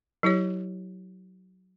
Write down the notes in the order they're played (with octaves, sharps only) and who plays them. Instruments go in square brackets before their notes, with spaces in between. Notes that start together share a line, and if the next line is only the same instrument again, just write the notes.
[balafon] F#3 E4 G4 C#5